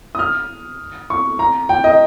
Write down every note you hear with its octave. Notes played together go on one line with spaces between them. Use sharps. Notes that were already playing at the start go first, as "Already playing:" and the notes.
D#6
F6
C#6
A#5
G5
D#5